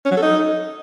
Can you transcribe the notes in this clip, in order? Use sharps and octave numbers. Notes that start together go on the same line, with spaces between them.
C#4
F#3
A4
D#4